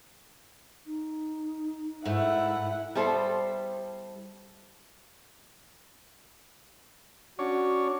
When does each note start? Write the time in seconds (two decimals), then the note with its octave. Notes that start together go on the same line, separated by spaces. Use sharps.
0.86 D#4
2.05 G#2 A3 E4 F#5
2.95 G3 B3 E4 A4 C5
7.39 C#4 D4 F#4 C#5